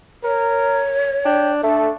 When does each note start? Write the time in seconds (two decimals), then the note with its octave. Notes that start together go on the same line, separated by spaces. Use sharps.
0.24 A#4 C#5
1.25 D4 G5
1.63 A3 D4 A4